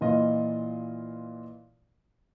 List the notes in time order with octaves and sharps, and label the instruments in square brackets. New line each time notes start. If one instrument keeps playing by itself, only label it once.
[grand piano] A#2 E3 F4 D#5